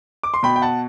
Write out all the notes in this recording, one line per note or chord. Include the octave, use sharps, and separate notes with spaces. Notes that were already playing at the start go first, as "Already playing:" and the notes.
D6
C6
B2 G5 B5
G5
F#5 A5